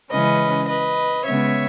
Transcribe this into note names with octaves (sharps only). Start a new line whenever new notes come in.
C#3 E3 G#3 C#4 B4 D#5
B4 D#5
C#3 G#3 B3 C#5 E5